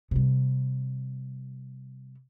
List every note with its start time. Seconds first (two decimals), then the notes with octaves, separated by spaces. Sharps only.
0.11 C3 G3